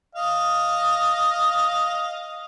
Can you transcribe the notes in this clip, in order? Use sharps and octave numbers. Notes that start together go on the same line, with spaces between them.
D#5 F5